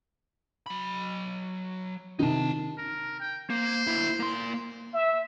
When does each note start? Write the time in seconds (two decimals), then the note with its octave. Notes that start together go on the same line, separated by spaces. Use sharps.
0.66 F#3 B5
2.19 C3 D#3 D#4 A5
2.77 A#4
3.20 G5
3.50 A#3 C5
3.87 D3 E4
4.20 A#3 C6
4.93 E5